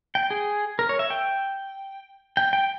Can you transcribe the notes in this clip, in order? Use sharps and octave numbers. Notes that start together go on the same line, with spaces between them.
G5
G#4
A#4
C#5
E5
G5
G5
G5